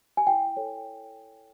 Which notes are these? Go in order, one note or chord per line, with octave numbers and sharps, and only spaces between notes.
G#5
E4 G5
A4 C#5